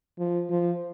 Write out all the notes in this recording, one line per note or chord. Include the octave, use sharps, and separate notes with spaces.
F3
F3